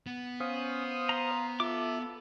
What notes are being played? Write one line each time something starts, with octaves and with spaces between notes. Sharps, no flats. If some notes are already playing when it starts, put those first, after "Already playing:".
B3
C#4 C5 F5 D#6
A#5 C6
F4 A4 E5 D6